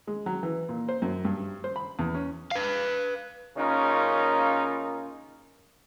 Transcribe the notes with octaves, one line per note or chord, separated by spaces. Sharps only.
G#3
F#3
E3
A#2
C5
F#2
G2
C5
B5
E2
C#4
B4 F5
C#3 A#3 C#4 D#4 F4 A#4